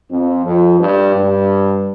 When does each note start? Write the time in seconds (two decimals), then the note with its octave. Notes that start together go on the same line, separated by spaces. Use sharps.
0.10 F2
0.45 F2
0.80 G2
1.14 G2